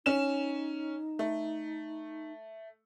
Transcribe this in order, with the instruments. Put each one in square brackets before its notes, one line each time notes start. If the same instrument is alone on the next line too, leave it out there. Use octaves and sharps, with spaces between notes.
[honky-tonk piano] C#4 E7 [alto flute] D#4
[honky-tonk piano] A3